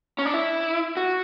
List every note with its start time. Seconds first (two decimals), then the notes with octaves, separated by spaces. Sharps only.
0.19 C#4
0.25 D4
0.34 E4
0.97 F#4